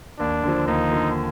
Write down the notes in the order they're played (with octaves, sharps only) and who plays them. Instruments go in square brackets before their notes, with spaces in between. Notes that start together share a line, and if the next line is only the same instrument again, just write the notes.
[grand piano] D#2 [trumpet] D4
[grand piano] D3 F3
[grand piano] D#2 [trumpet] D#4
[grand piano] D3 F3